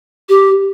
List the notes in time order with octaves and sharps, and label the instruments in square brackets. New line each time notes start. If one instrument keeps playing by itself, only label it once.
[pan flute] G4